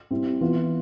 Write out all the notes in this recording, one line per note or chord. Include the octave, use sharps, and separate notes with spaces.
G3 C4 E4
E3 B3 F4